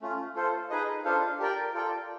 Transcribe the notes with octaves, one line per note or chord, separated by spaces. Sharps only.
A3 C#4 F4
F4 A4 C5
D#4 G#4 B4 D#5
D4 F4 A4 C5 F5
G4 A#4 D5 G5
F4 A4 D5 G5